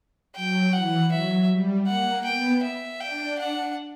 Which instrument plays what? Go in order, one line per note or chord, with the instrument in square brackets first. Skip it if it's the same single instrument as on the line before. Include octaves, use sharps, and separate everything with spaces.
[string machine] F#3 [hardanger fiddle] G5
[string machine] E3 [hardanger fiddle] F#5
[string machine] F#3 [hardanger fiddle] E5
[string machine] G3
[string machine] A#3 [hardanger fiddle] F#5
[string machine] B3 [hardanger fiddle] G5
[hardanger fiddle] E5
[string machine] D4 [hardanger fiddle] G5
[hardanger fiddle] F#5